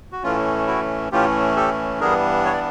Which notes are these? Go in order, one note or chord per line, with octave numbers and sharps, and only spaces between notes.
F#4
A2 E3 A3 C#4 F4
E4 F#4
A2 E3 A3 C#4 F4 G4
G4 A4
G2 E3 G3 B3 D4 G#4 A#4
C#5
D5